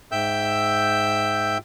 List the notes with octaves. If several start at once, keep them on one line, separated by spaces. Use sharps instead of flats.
G#2 E5 G5 E6 G6